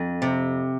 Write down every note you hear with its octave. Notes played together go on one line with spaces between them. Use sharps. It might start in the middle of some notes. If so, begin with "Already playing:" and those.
Already playing: F2
C3